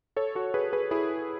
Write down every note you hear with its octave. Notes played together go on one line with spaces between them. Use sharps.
A4 C#5
F#4 A4
G#4 B4
G#4 B4
E4 G#4